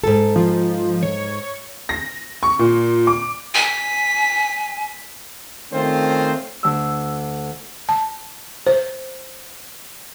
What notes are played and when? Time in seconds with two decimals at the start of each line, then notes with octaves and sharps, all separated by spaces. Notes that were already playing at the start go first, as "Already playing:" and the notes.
0.04 G#2 A4
0.36 F3
1.03 C#5
1.89 A#6
2.43 C#6
2.59 A#2
3.07 D6
3.54 G#5 B6
5.72 D#3 A3 C4 C#4 F4 C5
6.63 D2 E6
7.89 A5
8.67 C5